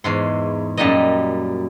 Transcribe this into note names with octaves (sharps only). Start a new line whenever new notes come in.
E2 G#2 C6
F#2 A#2 G3 D#4 D#5